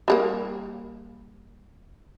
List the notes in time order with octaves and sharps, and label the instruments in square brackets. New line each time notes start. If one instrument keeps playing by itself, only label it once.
[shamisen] G3 G#3 A#3